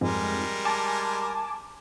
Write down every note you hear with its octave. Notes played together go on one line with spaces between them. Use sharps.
F2 G#2 G3 G#3 A#4
G#5 A5 D6